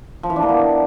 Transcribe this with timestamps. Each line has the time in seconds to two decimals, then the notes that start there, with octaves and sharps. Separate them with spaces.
0.23 F3
0.30 E3
0.36 D4
0.42 A#3
0.49 B3